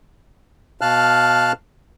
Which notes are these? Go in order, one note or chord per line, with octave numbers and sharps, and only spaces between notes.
B2 F5 A5 F6 F#6